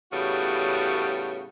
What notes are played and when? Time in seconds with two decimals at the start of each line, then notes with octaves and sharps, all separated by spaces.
0.13 A2 C#3 G3 B3 F#4